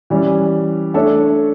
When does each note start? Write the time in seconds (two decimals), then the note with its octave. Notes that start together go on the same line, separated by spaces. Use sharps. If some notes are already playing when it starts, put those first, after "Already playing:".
0.10 E3 G3 C#4
0.94 A3 D4 A4 C#5 E5